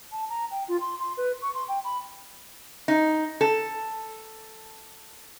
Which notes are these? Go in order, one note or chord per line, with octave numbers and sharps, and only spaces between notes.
A5
A#5
G5
F4
C6
C6
B4
C#6
C6
G5
B5
D#4
A4